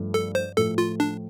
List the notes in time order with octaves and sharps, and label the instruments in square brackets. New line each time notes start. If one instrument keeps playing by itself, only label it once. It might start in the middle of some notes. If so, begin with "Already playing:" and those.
Already playing: [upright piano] G2 F3 A3
[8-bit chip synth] A4
C5
[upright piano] A2 F3 A3 [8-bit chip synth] A4
[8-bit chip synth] F4
D4